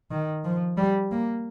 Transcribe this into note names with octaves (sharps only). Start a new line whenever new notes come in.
D#3
F3
G3
A#3